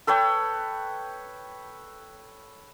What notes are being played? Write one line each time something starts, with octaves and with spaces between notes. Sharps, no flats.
A4 B4 C#5 G5